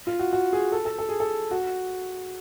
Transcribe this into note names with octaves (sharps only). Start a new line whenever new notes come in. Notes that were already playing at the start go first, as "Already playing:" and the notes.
F4
F#4
F#4
G#4
A4
A4
A4
G#4
A4
F#4